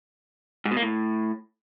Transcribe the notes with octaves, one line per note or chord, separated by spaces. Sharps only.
G#2
B2
A#3
A2